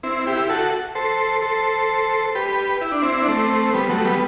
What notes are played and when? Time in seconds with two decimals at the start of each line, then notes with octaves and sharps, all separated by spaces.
0.03 C4 E4
0.26 E4 G4
0.49 F#4 A4
0.95 A4 C5
1.42 A4 C5
2.35 G4 B4
2.81 E4
2.92 D4
3.02 C4 E4
3.22 D4
3.28 A3 C4
3.73 G3 B3
3.89 F#3 A3
4.05 G3 B3